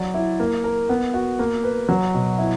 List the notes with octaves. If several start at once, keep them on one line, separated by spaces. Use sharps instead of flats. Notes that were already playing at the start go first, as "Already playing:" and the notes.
Already playing: F#3 D5
E4
A#3
A#4
B3
F#4
A#3
B4
F#3
B2
E4